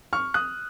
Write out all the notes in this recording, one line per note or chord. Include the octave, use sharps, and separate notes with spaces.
C#6 F6
D#6 F#6